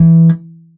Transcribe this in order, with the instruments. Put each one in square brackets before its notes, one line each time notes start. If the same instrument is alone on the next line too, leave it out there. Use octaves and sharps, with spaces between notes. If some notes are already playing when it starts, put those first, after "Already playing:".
Already playing: [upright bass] E3